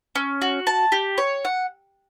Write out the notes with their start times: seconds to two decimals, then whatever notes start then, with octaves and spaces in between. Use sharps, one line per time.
0.15 C#4
0.42 F#4
0.67 A5
0.92 G4
1.18 C#5
1.45 F#5